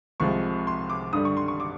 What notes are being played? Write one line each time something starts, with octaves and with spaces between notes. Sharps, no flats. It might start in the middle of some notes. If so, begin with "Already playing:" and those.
C2 C3 F3 G#3 C#6
C6
D6
G2 D3 G3 D#6
C#6
C6
C#6
D6